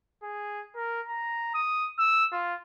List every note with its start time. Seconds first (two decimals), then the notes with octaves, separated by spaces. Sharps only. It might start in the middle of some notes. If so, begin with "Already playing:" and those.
0.23 G#4
0.76 A#4
1.09 A#5
1.55 D#6
1.99 E6
2.32 F4